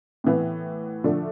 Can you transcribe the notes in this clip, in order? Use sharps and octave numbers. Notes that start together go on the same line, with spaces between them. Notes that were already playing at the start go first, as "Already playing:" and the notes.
A2 E3 B3
D3 F3 A3 D4